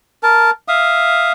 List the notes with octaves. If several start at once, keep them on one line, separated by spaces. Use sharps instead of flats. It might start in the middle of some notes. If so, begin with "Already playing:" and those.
A#4 A5
E5 F5 D#6